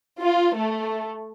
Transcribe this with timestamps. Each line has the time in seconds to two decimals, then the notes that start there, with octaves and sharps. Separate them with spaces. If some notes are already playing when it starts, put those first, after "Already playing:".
0.20 F4
0.56 A3